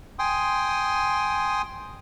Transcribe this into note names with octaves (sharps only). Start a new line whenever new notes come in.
G5 G#5 C6 D#6